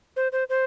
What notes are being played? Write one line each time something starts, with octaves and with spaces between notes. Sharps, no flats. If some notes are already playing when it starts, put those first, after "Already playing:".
C5
C5
C5